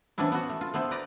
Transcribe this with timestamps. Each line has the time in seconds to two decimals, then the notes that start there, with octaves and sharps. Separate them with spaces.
0.18 E3 F3 B3 C#4 D4 E4
0.32 B3 F#4
0.49 A3
0.61 F4
0.74 A3 B3 E4 C5
0.91 B4 D5 A#5